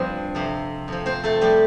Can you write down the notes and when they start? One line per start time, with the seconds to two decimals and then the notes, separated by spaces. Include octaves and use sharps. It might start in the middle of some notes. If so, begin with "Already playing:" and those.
Already playing: G2 F3 C4 D4 C5
0.35 F2 C3 F3
0.88 F2 F3
1.06 C4 C5
1.23 A3 A4
1.41 F3 G3 G4